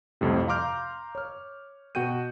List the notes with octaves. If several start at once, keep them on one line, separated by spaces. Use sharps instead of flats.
C2 F2 A2 C3
F5 A#5 C6 D6 F6 G6
C#5 F6
B2 F#4 G5 G6 D#7